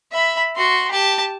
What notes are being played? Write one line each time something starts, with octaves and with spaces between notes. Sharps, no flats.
E5 B5
F#4 C6
G4 A5